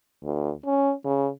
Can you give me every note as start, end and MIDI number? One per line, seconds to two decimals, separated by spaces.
0.24 0.51 38
0.66 0.93 61
1.05 1.29 49